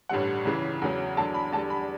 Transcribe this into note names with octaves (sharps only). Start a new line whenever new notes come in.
A1 G2 D3 G3 F#5
C#2 C#3 E3
E2 C#3 F#3
E2 D3 F#3 A5
B5
E2 D3 G3 A5
B5